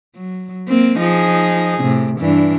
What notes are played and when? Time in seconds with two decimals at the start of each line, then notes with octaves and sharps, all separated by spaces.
0.16 F#3
0.68 A#3 C4
0.99 F3 D#4 G#4
1.82 A2 C3
2.19 G2 E3 D4